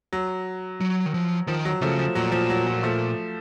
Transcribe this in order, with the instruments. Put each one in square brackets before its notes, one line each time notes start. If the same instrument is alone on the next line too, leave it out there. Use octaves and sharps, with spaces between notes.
[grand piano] F#3
[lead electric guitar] F#3
D#3
F3
[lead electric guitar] D#3 [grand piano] F3
[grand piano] F#3
[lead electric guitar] C#3 [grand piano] F3 A3
[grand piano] F3
[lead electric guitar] A#2 [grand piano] F#3
[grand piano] F3
F#3
F#3
F3 A3